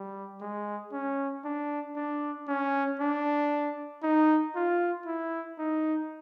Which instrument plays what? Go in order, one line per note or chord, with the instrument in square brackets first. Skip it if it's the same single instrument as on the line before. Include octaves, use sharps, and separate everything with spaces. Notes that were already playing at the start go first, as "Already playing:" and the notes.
Already playing: [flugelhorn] G3
G#3
C#4
D4
D4
C#4
D4
D#4
F4
E4
D#4